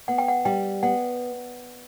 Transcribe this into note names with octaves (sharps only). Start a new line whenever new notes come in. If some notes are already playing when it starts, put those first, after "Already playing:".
B3 F#5
G5
F#5
G3 G5
B3 F#5